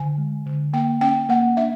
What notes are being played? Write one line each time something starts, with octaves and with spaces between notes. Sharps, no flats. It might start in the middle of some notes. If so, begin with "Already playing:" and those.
Already playing: D3 G#5
G#3
D3
A#3 G5
C#4 G5
A#3 F#5
D4 E5